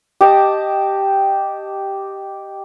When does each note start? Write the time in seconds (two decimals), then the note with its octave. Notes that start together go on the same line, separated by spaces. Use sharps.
0.21 G4 D#5 A5